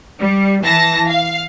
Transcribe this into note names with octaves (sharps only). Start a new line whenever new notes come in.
G3
E3 A5 A#6
F5